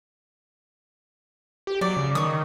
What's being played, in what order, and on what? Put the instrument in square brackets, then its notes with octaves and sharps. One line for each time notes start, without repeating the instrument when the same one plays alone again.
[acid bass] G4
[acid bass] F#3 [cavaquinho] D5
[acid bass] C#3
[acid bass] D#3 [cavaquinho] C#6 D#6